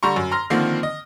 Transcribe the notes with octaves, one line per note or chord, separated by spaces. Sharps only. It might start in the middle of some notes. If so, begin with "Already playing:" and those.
D3 G3 A#5 C6 C#6
F#2
A#5 C6 F6 A#6
D3 D#3 F3 A#3 C4
D#5